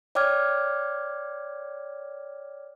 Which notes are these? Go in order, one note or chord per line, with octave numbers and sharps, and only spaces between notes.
C#5 D5 G5 D6 F6 G#6